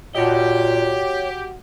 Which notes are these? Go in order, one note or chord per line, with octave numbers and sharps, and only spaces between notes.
A#2 F#4 G4 C#5 D#5